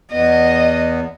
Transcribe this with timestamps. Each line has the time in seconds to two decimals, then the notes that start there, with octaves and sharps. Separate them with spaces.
0.12 E2 B3 D#5